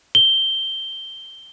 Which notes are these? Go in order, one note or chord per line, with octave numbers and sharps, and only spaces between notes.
G7